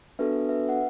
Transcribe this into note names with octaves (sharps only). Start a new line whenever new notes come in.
B3 D4 F#4 A4 B4 E5
B4 E5
F#5